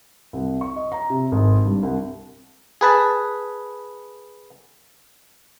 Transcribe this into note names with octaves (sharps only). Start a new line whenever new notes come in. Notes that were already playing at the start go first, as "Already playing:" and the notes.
C2
C#6
D#5
A#5
C3
G#1
G2
C2
G#4 B4 A5